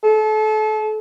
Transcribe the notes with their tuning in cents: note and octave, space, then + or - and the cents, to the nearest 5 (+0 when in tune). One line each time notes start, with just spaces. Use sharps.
A4 -30